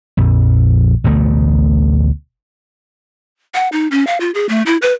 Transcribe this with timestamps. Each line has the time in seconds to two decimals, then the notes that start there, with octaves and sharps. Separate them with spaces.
0.17 A#1 F2
1.04 A1 D2 B2 A3
3.54 F#5
3.72 D#4
3.91 C#4
4.07 F5
4.20 F4
4.34 G#4
4.49 A3
4.66 E4
4.82 B4